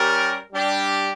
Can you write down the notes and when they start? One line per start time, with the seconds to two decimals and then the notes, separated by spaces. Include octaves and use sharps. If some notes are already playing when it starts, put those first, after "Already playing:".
Already playing: G3 C#4 G4 A#4
0.52 G3 D4 G4